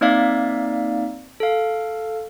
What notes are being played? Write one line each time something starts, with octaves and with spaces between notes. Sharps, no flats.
A#3 C4 D#4 D5 E5 F5
A4 F5